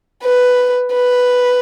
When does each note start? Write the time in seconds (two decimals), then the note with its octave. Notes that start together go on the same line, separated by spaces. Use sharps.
0.24 B4
0.94 B4